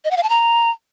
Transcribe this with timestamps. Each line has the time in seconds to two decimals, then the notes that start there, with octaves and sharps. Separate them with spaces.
0.05 D#5
0.11 F#5
0.17 F5
0.23 A5
0.29 A#5